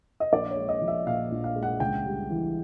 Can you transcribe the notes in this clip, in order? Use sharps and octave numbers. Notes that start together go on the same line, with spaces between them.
D#5
A#1 D5
C#5
G#3
D#5
F3
E5
A#2 F5
A#1
F5
G#3
F#5
C#2 G5
G3
E3